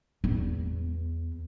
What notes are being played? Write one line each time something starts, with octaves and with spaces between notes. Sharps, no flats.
E2